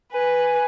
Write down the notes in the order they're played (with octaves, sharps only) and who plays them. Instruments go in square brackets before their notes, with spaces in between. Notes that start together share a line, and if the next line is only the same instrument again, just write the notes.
[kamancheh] B4 [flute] G#5